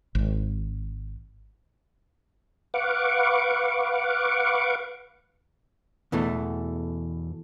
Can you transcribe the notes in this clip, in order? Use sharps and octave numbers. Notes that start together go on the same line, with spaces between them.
G#1
B4 F5 F#5 C#6 D6
E2 B2 E3 A3